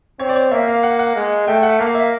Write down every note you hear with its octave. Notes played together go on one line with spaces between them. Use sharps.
C4 C#5
D5
C#5
A#3 E5
F5
F#5
F#5
G#3
A3 G5
F#5
A#3 F5
E5